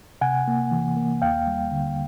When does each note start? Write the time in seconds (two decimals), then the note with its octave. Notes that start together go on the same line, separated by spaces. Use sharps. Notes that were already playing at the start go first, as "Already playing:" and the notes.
0.21 C3 F#5 G#5
0.48 A#3
0.72 E3
0.97 A#3
1.22 D#2 F5 G5
1.47 G3
1.72 D3